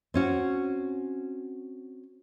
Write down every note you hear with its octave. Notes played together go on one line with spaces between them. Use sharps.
C4 C#4 F#4